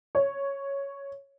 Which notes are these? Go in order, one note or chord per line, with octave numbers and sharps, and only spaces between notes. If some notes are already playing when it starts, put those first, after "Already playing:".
C#5